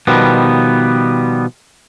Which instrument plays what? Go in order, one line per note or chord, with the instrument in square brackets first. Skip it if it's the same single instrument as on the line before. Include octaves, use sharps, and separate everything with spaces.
[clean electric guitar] B2 D#3 F3 G3 B3